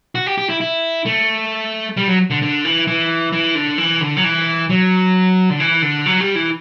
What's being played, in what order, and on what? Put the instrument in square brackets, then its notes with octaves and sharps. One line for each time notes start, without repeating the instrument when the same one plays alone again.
[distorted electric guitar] F#4
G4
G4
E4
E4
A3
G3
F#3
D3
D3
E3
E3
E3
D3
E3
D3
F#3
E3
F#3
D3
E3
D3
F#3
G3
E3